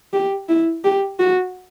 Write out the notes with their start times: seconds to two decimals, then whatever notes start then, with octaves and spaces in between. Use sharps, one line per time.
0.13 G4
0.49 E4
0.84 G4
1.19 F#4